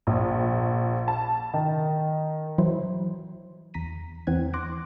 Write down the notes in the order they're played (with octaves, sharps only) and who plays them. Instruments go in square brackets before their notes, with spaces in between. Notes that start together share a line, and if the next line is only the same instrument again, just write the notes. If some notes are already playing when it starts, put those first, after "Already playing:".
[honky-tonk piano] A#1
A5
D#3
[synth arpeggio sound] E3 F#3 E4 C5
E2 A#5 B6 D#7
E2 E3 C4 F#5 G#6
C6 D6 F#6 A#6 D7